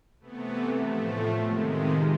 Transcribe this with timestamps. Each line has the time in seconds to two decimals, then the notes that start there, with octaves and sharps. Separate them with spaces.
0.20 C3 E3 A3 B3
0.82 A2 F3 A3
1.42 C3 D#3 G#3 B3
1.74 F4